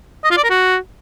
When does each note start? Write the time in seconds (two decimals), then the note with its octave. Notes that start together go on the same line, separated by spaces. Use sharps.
0.24 D#5
0.31 F4
0.37 D5
0.44 A#4
0.50 F#4